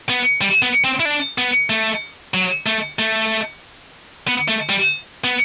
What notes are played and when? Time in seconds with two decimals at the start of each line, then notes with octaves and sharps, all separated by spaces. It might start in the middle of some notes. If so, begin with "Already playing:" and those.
0.09 B3
0.41 G3
0.62 B3
0.84 C4
1.00 E4
1.05 D4
1.38 B3
1.70 A3
2.34 F#3
2.66 A3
2.99 A3
4.28 B3
4.48 A3
4.69 G3
5.24 B3